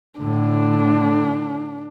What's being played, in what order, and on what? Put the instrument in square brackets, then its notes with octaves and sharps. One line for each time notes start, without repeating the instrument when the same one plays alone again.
[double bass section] A2 D3 [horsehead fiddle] D4